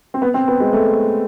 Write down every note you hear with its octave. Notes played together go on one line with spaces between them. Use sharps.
C4
B3
C4
B3
G#3
A3